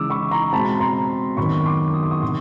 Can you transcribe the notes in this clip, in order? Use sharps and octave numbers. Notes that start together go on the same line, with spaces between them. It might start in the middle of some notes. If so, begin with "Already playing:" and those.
Already playing: C#3 E3 G#3 D6 E6
B5 C#6
A#5 C6
B2 G#3 C4 A5 B5
A#5 C6
F#2 D#3 F#3 B3 B5 C#6
C6 D6
D#6
D6
C#6 D#6
C3 D#3 C6 D6